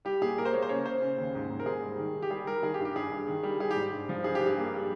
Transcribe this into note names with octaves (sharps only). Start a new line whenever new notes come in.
G3 G4
A#2 G#4
A#3 A#4
C5
A#3 C#5
C5
C#3 C#5
C#3 C5
C#3
D#2
G#2
G#2
A#4
G#2 G#4
G3
D#3
D#3
G4
G3 G#4
G3 A#4
D#3 G#4
G4
G2
G4
G2 G#4
G2
D#3
G3
G3 G#4
G4
G#2
G2
F3
G2 G#4
G2 G4
G#4
A#3
G3